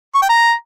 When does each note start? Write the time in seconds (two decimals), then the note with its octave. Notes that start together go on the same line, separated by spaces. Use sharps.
0.15 C#6
0.22 G5
0.29 A#5